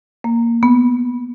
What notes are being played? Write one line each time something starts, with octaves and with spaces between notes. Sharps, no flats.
A#3
B3